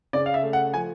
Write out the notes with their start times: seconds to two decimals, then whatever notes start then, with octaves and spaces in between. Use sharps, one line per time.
0.13 C#3 D5
0.26 F5
0.34 E5
0.43 A3
0.53 F#5
0.74 F3 G#5